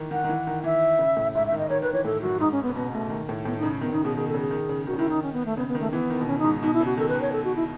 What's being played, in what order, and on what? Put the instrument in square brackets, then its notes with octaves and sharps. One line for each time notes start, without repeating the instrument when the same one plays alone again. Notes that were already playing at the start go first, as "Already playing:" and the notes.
Already playing: [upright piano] D#3 E3
[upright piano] D#3 [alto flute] F#5
[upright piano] D#3
E3
D#3
[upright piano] E3 [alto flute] E5
[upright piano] C#3
A2
[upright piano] G#2 [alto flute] E5
[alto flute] E5
[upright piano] D#3
[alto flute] D#5
[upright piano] D#3 [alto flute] C#5
[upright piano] D#3 [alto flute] B4
[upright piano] E3 [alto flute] C#5
[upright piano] A2 [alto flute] A4
[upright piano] F#2 [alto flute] F#4
[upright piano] G#2 [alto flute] D#4
[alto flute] C#4
B3
[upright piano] C#3
[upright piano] B2 [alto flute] B3
[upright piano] B2 [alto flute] A3
[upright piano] D#3
A2
[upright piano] A2 [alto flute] B3
[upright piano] C#3 [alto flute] D#4
[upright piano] D#3 [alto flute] B3
[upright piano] C#3 [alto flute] D#4
[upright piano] B2 [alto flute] G#4
[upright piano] D#3 [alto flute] G#4
[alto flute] A4
[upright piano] C#3
[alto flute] G#4
[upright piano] D#3
C#3
[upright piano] D#3 [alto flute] F#4
[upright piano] C#3
[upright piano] D#3 [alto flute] E4
[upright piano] D#3 [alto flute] D#4
[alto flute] C#4
B3
A3
[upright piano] C#3 [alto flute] B3
[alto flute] B3
[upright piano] D#3
[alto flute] A3
[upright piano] E3 [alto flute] B3
[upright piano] D#3
B2
[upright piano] C#3 [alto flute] C#4
[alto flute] D#4
[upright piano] G#2
[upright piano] B2 [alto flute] D#4
[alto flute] E4
[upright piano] C#3
[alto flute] F#4
[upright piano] D#3 [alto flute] A4
[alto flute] B4
[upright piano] D#3
[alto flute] C#5
A4
F#4
E4